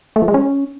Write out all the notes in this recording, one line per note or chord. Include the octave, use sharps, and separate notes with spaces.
A3
F3
G#3
C#4